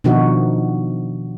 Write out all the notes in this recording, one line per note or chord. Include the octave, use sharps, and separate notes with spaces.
B2 D#3 F3 D4 D#4 F#4